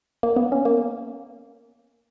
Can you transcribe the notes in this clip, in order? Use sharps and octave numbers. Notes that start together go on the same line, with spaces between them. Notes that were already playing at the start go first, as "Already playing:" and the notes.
A#3
B3
C#4
A#3